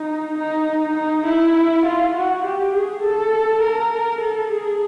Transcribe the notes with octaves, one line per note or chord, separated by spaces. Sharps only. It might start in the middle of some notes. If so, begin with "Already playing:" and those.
Already playing: D#4
D#4
D#4
E4
F4
F#4
G4
G#4
A4
A#4
A4
G#4